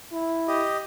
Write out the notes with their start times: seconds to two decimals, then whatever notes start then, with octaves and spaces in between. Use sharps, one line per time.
0.12 E4
0.48 G4 D#5